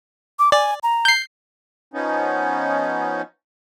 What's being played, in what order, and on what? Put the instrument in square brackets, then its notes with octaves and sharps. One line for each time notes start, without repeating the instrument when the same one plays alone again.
[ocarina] D6
[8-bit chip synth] D5 [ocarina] G#5
[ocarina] A#5
[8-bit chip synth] G6 C7
[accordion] F3 B3 C#4 D#4